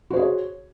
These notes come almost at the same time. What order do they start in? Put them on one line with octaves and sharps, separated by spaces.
F#4 C5 G#4 C#5